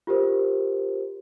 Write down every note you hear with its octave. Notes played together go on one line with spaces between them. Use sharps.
F4 G4 A#4 C5